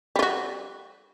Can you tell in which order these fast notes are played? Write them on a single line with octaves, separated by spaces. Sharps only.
G3 F4 F#4